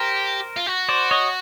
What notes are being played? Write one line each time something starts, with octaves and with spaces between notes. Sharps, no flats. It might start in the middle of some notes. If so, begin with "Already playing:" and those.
Already playing: G4 A#4 C5
F4
F#4
C5 D5
C#5 D#5